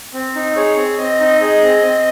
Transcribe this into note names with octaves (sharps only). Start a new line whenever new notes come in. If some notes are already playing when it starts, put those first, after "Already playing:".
C4
D#4
G#4 C#5
C4
C4 D#5
D#4
G#4
C4
C4